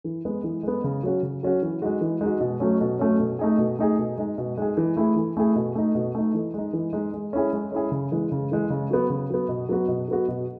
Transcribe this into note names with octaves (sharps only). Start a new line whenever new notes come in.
E3
G#3 B3
E3
G#3 B3
C#3
F#3 C#4 F#4
C#3
F#3 C#4 F#4
E3
G#3 D#4 F#4
E3
G#3 D#4 F#4
B2
F#3 A3 C#4
B2
F#3 A3 C#4
B2
A3 D#4 G#4
B2
A3 D#4 G#4
B2
G#3 D#4 G#4
B2
G#3 D#4 G#4
E3
A3 E4 G#4
E3
A3 E4 G#4
B2
A3 D#4
B2
A3 D#4
E3
G#3 D#4
E3
G#3 D#4
G#3
C#4 E4 G#4
G#3
C#4 E4 G#4
C#3
E3 G#3
C#3
E3 G#3
C#3
F#3 B3
C#3
F#3 B3
B2
F#3 B3 F#4
B2
F#3 B3 F#4
B2